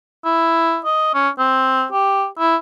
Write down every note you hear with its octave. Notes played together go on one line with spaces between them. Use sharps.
E4
D#5
C#4
C4
G4
E4